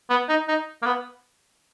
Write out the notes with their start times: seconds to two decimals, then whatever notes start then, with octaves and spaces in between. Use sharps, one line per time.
0.10 B3
0.29 D#4
0.48 D#4
0.82 A#3
0.86 B3